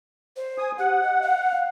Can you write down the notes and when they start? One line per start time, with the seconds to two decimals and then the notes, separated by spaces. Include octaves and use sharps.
0.36 C5
0.58 G#5 D#6
0.79 G4 F#5
1.03 D#5
1.22 F5